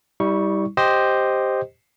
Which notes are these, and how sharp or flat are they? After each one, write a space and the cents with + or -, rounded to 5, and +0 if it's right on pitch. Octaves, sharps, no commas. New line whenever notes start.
G3 +0 E4 -40 C#6 +0
G4 +0 C5 +0 D#5 +0